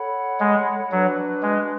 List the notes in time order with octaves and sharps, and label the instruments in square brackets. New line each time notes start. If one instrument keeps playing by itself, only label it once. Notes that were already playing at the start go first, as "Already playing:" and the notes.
Already playing: [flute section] A4 C#5 F#5 B5
[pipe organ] G#3
[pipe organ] F#3 [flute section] D4 F#4 B4
[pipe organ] G#3